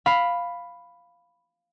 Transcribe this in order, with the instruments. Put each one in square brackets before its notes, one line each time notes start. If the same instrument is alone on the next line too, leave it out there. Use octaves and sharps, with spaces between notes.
[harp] F5 B5